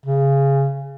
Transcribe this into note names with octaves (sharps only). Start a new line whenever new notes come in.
C#3